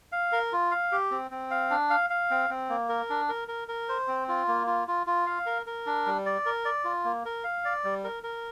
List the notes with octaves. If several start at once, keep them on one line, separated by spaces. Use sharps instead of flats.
F5
A#4
F4
F5
G4
C4
C4
F5
D4
F5
F5
C4
C4
A#3
A#4
D4
A#4
A#4
A#4
C5
C4
F4
A#3
F4
F4
F4
F5
A#4
A#4
D4
G3
D5
A#4
D5
F4
A#3
A#4
F5
D5
G3
A#4
A#4